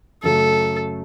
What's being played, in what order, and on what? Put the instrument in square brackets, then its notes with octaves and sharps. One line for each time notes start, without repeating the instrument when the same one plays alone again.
[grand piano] F#2 C#3 F#3 A3 [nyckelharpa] A4